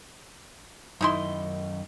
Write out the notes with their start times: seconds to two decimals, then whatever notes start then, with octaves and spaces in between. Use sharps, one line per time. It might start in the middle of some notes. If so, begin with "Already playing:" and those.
1.01 F#2 D#3 D#4 E4 D#5 C6